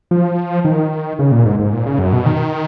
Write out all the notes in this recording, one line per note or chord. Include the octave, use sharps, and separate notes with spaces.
F3
D#3
C#3
A#2
G#2
G#2
A#2
C#3
F#2
B2
D#3